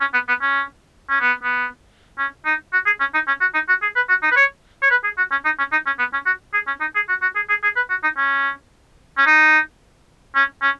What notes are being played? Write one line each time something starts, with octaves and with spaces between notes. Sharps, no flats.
C#4
B3
B3
C#4
C#4
B3
B3
C#4
D#4
F#4
G#4
C#4
D#4
C#4
F#4
D#4
F#4
G#4
B4
F#4
D#4
B4
C#5
C#5
B4
G#4
F#4
C#4
D#4
C#4
D#4
C#4
B3
C#4
F#4
G#4
C#4
D#4
G#4
F#4
F#4
G#4
G#4
G#4
B4
F#4
D#4
C#4
C#4
D#4
C#4
C#4